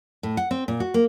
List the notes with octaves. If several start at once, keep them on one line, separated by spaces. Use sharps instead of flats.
A2
F#5
C4
A#2
F#4
A#3